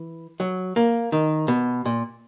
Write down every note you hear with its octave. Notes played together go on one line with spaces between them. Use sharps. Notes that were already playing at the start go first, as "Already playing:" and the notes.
Already playing: E3
F#3
A#3
D#3
B2
A#2